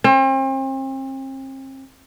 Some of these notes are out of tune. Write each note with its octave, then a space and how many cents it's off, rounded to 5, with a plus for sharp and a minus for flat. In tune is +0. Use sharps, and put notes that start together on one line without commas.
C4 +40